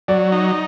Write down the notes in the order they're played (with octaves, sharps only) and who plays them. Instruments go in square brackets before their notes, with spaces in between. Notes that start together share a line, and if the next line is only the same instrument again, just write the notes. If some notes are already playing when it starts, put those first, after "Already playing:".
[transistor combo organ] F#3 [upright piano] D5
[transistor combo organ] D#4